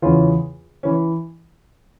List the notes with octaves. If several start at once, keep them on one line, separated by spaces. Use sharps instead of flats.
E2 C#3 E3 C#4 F4
E3 C#4